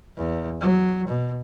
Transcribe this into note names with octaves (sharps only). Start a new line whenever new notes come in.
E2
F#3
B2